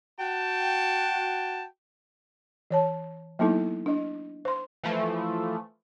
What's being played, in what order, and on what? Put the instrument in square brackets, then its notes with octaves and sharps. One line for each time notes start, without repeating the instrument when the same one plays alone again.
[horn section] F#4 G5 A5
[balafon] E3 C#5 A5
F#3 A#3 B3 D#4 E4 A4
D4 D#5
C5 C6
[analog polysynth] E3 F3 A3